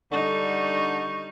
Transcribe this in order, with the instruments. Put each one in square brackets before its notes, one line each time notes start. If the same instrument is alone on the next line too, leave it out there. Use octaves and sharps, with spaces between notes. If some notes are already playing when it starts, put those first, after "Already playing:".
[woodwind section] D3 [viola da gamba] G3 D#4 [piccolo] C#6